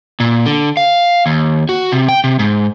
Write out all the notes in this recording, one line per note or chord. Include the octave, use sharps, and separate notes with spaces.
A#2
D3
F5
D#2
F#4
C3
G5
C3
G#2